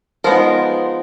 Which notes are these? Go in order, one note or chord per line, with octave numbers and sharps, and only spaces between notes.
F3 G#3 B3 D#4 A#4